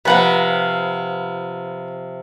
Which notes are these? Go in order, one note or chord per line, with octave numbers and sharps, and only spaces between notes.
C3 F3 B4 F#5 A#5